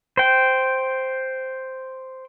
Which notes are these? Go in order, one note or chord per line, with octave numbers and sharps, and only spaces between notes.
C5 G5